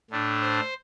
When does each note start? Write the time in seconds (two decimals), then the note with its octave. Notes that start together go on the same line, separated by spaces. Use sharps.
0.11 A2 A3 D4
0.41 C5